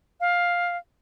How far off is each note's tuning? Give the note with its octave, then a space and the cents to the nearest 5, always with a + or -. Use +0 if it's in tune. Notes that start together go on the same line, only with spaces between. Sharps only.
F5 +10